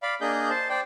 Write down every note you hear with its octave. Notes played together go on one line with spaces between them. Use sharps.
D5 F5 B5
A#3 D4 G#4 D#5 G6
C5 A5
C5 D5 G5